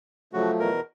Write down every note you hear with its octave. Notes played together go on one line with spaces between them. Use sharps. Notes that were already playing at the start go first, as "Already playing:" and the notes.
C#3 F3 F#3 A3 F#4
E2 B2 A#4